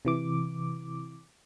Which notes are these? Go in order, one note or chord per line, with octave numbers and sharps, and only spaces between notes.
C3 E3 D6